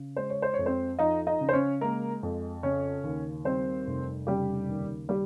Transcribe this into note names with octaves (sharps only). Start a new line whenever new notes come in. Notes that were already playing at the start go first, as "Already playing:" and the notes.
Already playing: C#3
G#3 C5
C#5
C5
C#5
F2
C4 C5
F3 D#4 D#5
D#4 D#5
C#3
C5
C#4 C#5
G#3 A#3 A#4
F2
C#3 C#4 C#5
D#2
G3 C4 C5
F1
C#3 G3 G4
D#2
G3 G4